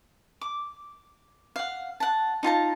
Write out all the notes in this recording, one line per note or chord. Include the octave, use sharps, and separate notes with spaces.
D6
F5 F#5
F#5 A5
D#4 F4 A5 A#5